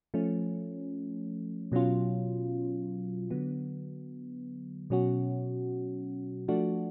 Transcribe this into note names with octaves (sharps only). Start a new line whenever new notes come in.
F3 A3 C#4
B2 F#3 C#4 F4
D3 F#3 B3
B2 F#3 C#4 F#4
F3 A3 D4 F#4